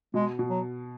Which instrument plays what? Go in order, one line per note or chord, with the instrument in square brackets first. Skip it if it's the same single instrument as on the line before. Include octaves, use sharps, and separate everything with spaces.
[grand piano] B2 [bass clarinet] G#3
[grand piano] B2
[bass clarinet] F#3